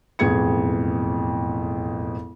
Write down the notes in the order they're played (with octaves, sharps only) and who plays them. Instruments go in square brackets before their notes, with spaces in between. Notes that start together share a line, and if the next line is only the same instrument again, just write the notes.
[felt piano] E1 A1 F2 G#4 G#6 C#7